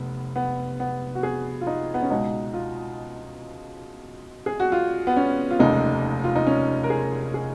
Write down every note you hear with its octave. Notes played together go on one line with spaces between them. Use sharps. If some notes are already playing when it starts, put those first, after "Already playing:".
Already playing: F1 B3
B3
B3
F#4
G#4
F4
D#4
B3
C#4
C#2 B2 G#3 D#4
F4
G#4
F#4
F4
B3
C#4
F4
F1 D#2 C#3 G#3 D#4
F4
D#4
C#4
A#4
G#4
G#4